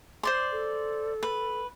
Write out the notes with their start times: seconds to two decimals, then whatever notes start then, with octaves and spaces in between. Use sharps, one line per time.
0.23 C5 D5 C6
0.52 A4
1.23 B4